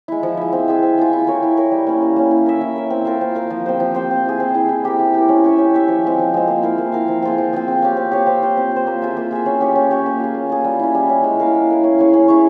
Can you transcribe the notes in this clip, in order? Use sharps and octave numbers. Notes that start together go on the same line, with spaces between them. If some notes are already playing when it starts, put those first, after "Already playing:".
G#3 E4
F3
G#3 E4
C4
F4 G#4 E5
C4
F4 G#4 E5
E4
A#4 C#5
E4
A#4 C#5
G3
A#3 C#4
G3
A#3 C#4
E4
A#4 E5
E4
A#4 E5
C4
F4 A#4 F5
C4
F4 A#4 F5
F3
C4 G4 C5
F3
C4 G4 C5
C4
E4 G#4
C4
E4 G#4
E4
G4 A#4
E4
G4 A#4
C#4
G4 C#5 E5
C#4
G4 C#5 E5
F3
G#3 C4
F3
G#3 C4
A#3
E4 A#4 F5
A#3
E4 A#4 F5
F3
C4 F4 G#4
F3
C4 F4 G#4
C4
G4 C#5 F5
C4
G4 C#5 F5
C4
F4 C5
C4
F4
C5
A#3
F4 G#4 E5
A#3
F4 G#4 E5
C#4
G4 C#5
C#4
G4 C#5
A#3
F4 G#4
A#3
F4 G#4
G3
C#4 E4
G3
C#4 E4
G#3
E4 A#4 F5
G#3
E4 A#4 F5
C#4
E4 G#4 C#5
C#4
E4 G#4 C#5